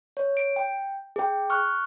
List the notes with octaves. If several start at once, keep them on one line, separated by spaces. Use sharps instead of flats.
C#5
D7
G5
G#4 G5
C#6 F6 F#6